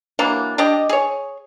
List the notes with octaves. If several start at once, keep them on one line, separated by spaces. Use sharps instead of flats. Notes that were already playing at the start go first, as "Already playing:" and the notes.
E3 F#3 A#3 D4
D4 G4 D5 D#5
G#4 C#5